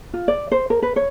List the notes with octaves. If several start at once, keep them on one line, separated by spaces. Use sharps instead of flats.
F4
D5
C5
A#4
B4
C#5